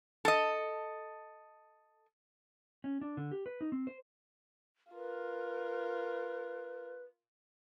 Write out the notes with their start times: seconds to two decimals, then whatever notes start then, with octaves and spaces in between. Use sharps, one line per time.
0.25 A4 D#5
2.84 C#4
3.01 D4
3.17 D3
3.32 G4
3.46 B4
3.61 D#4
3.72 C4
3.87 C5
4.93 F4 A#4 B4